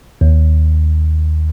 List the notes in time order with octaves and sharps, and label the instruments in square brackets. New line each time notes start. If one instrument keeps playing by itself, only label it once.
[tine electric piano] D#2